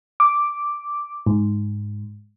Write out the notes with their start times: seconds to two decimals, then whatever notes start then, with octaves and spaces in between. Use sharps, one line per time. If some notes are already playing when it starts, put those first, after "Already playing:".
0.20 D6
1.26 G#2